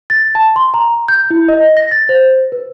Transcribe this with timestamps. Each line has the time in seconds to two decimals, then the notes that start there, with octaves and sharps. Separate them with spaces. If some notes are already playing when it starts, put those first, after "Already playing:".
0.10 A6
0.35 A5
0.56 C6
0.74 A#5
1.08 G6
1.30 E4
1.48 D#5
1.77 A#6
1.91 A6
2.09 C5
2.52 B4